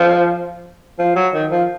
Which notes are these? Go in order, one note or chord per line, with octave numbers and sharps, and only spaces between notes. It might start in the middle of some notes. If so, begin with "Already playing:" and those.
Already playing: F3
F3
F#3
D#3
F3